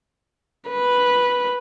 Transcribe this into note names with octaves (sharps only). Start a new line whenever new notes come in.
B4